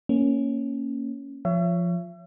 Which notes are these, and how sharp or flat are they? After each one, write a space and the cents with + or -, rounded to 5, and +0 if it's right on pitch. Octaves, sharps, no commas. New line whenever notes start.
A#3 +0 C#4 +0
F3 +0 C#5 +15 E5 +40